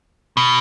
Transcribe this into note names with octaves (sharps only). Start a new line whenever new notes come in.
B2